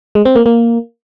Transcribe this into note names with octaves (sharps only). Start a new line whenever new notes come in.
G#3
C4
A#3
A#3